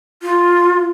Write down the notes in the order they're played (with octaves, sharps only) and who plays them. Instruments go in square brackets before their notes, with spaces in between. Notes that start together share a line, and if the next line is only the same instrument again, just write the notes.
[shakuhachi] F4